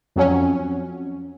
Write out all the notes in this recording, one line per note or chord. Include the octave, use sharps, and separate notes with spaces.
F2 F#3 C#4